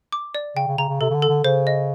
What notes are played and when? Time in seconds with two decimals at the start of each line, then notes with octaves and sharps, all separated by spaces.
0.12 D6
0.35 D5
0.56 C#3 G5
0.68 C#3
0.78 C#3 A#5
0.89 C#3
1.01 C3 A4
1.11 C#3
1.15 D3
1.22 A4
1.29 D3
1.44 C#3 C5
1.67 D#5